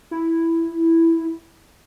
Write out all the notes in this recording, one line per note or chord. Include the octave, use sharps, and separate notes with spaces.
E4